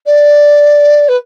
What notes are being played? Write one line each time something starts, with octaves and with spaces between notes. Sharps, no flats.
D5
B4